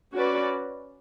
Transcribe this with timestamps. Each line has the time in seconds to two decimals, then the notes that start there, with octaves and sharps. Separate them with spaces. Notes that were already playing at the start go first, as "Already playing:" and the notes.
0.13 C#4 F#4 B4 D5